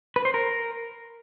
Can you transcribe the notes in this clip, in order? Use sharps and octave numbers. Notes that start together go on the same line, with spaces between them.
B4
C5
A#4